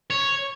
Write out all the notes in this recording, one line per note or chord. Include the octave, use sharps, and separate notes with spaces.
C#5